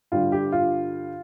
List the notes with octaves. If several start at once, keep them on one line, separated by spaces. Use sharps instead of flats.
G2 D3 G3 F4
G4
F4